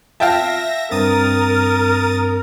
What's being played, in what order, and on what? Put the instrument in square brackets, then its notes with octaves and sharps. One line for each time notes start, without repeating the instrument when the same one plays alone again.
[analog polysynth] E5 A#6 [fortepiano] F5 G5 A5
[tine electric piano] G2 C4 [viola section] A#4 [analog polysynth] D#6 A6